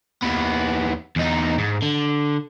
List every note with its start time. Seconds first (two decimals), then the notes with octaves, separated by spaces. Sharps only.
0.23 D#2 B3
1.16 E2 D#4
1.59 G#2
1.83 D3